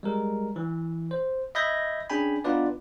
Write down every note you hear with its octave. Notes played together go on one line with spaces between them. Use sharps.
G3 G#3 A#4
E3
C5
D#5 E5 B5 G6 G#6 A#6
C#4 D4 G#4 G5 G#5 B5
B3 D4 D#4 F4 B4 D5